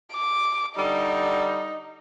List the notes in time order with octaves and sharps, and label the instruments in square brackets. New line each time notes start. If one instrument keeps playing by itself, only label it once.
[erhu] D6
[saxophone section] D3 G3 [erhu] D#4